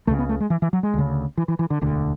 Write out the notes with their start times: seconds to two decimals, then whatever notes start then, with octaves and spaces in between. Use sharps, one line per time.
0.07 C#2 C#3 A3
0.19 B3
0.29 A3
0.40 G#3
0.50 E3
0.62 E3
0.73 F#3
0.83 G#3
0.94 D2 C#3
1.37 E3
1.48 E3
1.59 E3
1.70 D3
1.81 E1 D2 D3